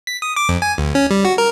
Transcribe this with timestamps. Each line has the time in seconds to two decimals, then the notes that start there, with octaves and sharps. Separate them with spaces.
0.07 B6
0.22 D#6
0.36 D6
0.49 F2
0.62 G#5
0.78 D2
0.95 C#4
1.11 G3
1.25 F#4
1.38 A#4